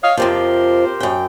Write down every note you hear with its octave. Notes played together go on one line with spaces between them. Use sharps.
C#5 D#5 F5
F2 C3 F3 G4 A#4 C5
F#2 G5